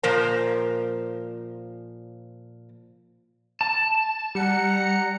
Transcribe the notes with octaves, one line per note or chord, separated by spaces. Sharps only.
A#2 F3 A#4 C5 A#5
A5
G3 F#5 A#5 C#7